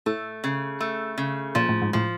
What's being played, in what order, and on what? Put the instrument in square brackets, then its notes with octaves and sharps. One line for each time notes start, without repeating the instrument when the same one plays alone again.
[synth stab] A2 [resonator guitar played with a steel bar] A3
[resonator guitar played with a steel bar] C#3
A3
C#3
[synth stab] A#2 [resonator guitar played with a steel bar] F3
[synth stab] A2
G#2
[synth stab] A2 [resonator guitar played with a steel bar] F3